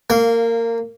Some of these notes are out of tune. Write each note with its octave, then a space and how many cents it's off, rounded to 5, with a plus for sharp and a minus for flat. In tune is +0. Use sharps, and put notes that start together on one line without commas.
A#3 -20 F5 +0